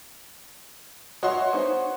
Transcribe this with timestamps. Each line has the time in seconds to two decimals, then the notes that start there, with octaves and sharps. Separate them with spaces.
1.23 F#4 C#5 D#5 E5 C6
1.53 B3 D#4 C5